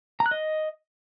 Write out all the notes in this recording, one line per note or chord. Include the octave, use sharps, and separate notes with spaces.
A#5
F#6
D#5